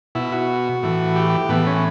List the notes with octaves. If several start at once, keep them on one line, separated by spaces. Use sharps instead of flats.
B2 E4
F#4
A2 E3
G4
A2 E3 B3
C#4